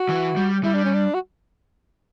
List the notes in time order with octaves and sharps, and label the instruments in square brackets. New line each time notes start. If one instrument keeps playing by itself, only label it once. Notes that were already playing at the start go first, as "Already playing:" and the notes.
Already playing: [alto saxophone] F#4
[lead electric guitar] E3
G3
[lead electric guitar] G3 [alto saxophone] E4
[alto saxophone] D4
C#4
D4
F#4